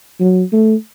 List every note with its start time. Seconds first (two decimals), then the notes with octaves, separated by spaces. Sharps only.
0.20 F#3
0.52 A3